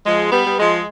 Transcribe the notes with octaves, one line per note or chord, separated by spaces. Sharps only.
F3 G#3
G3 B3
G3
F3 G#3